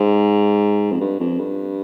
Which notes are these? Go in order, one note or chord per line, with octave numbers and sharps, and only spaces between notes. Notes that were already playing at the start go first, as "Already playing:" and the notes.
Already playing: G#2
F2
G2
F2
G2